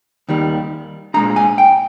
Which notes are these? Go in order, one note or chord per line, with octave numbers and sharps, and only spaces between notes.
D#2 D#3 G3
A#2 G#3 D4 A#5
G#5
G5